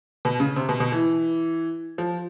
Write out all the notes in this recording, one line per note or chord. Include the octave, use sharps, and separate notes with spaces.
B2
C#3
C3
B2
B2
E3
F3